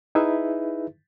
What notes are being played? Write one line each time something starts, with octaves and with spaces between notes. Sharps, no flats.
D#4 E4 G#4 B4 E5